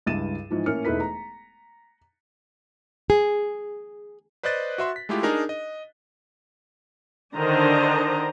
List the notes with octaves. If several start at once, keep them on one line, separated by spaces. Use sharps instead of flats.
C#2 G2 E4 A6 D#7 E7
G#2 E3 F3
A2 A#3 C#4 F6 C#7
E1 A3 D#4 E4 B4 B6
A#5
G#4
B4 C5 D5 D#5 F#6 A6
F#4 E5 C6
B6
G#3 A3 E4 F4 G4
D4 D#4 G#4 A#4
D#5
D3 D#3 D4 C5 D#5 A#5